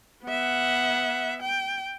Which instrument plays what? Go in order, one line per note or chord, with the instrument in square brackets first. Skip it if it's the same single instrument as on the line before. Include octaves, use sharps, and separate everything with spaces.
[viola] B3 E5 [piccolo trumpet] F#5
[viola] G5